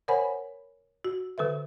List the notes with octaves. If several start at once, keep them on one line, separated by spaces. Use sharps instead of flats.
A#4 C5 C#5 F#5 G#5 B5
F#4
D3 A4 B4 E5